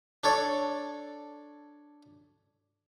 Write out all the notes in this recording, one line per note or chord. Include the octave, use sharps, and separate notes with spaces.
D4 A4 C#5 D5